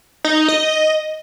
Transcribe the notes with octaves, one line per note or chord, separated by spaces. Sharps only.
D#4
D#5